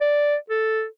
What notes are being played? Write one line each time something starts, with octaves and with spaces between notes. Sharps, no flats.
D5
A4